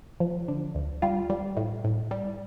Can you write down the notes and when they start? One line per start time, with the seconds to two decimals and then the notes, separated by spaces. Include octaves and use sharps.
0.20 F3
0.48 D3
0.75 D2
1.02 G3 F4
1.30 G3
1.57 A2
1.84 A2
2.11 G3